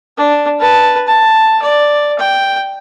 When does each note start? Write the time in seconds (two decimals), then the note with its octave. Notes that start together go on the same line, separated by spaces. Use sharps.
0.17 D4
0.60 B4 A5
1.07 A5
1.62 D5
2.19 G5